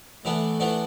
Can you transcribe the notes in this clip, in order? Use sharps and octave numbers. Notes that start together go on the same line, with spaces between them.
E3 A3 B3 D4
E3 B3 D4